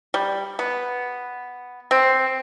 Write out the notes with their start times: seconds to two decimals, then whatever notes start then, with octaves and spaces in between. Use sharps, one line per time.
0.14 G3
0.59 B3
1.91 C4